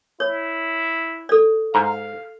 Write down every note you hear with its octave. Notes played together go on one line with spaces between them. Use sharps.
E4 C#5
A4 D5
G#2 F5 A#5